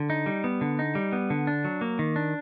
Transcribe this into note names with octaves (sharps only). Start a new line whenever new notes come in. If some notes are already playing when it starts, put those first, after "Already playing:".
Already playing: D3
D#4
G3
B3
D3
D#4
G3
B3
D3
D4
F#3
A#3
D#3
D4